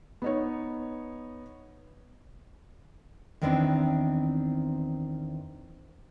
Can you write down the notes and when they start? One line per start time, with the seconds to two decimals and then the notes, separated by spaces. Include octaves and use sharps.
0.22 B3 D#4 C#5
3.42 E2 D#3 B3 C4 D4 E4